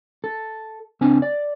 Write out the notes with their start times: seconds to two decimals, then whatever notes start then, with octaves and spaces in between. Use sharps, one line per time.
0.24 A4
1.01 C#2 C4 D4 G#5
1.22 D5